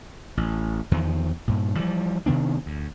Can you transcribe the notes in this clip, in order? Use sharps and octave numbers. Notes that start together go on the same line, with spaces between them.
A1
E2 D#3 F3
G2 A#2
E3 F3 G3
C3 D#3 B3 D4
D2